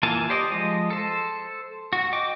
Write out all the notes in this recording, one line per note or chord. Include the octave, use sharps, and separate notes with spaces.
E3 A#3 F4 G#5 A5
G4 C5 D5 D#5
F3 G#3 D#5
A4 C5
F#4
D#5 G5 D6